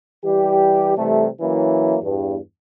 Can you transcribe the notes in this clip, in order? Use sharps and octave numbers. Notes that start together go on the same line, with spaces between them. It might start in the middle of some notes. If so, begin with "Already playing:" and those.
E3 G3 G4
C3 E3 G3 A3
E3 F#3 A#3 C#4 E4
E2 G2